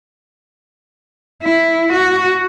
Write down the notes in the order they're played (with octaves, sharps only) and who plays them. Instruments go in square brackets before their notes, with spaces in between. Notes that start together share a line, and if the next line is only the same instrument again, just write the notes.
[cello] E4
F#4